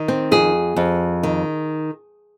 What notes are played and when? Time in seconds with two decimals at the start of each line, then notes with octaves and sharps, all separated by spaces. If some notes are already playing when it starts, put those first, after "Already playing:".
Already playing: D#3
0.08 C4
0.31 F2 G#4
0.76 F2
1.23 D#3